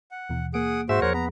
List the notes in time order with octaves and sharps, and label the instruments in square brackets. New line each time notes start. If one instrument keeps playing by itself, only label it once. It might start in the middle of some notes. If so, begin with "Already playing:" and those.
[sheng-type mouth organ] F#5
[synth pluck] D#2 B2 E3
[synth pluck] A#3 D7 [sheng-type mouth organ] G#4 F#5 D#6
[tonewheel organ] G#2 E5 [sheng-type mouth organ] F#4 C5 [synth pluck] G#4
[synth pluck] E2 F3 [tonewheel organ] A#4 C#5 [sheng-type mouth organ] C5 F#5
[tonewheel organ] B3 [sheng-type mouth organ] A#5